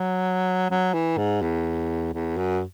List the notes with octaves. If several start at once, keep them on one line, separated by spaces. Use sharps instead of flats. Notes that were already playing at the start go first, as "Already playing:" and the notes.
Already playing: F#3
F#3
E3
G#2
E2
E2
F#2